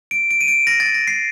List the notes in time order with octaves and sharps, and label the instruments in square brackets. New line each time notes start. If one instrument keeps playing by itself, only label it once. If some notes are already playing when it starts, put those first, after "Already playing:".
[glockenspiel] D7
D7
D#7
D7
A#6
A6
A#6
C7